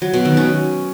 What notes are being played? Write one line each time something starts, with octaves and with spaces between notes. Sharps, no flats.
F#3
B2
D#3
C#4